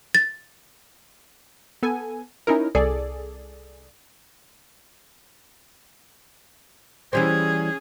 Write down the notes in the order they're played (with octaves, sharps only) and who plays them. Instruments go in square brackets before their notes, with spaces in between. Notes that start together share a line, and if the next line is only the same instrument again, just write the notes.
[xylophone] A6
[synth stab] B3 A4 G#5
C#4 D#4 E4 A#4
C2 G#4 A4 D5
[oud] E3 G3 C5 [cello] C#4 G#4